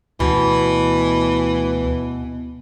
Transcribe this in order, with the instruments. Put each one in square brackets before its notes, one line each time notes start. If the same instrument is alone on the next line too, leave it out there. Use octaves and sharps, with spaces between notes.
[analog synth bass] D2 [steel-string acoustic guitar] B2 [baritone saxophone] E3